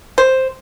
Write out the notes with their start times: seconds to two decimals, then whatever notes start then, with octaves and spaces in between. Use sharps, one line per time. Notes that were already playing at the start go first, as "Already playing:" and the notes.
0.18 C5